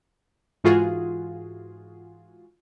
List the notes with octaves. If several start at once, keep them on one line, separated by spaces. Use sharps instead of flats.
G#2 E3 F4 F#4 G#4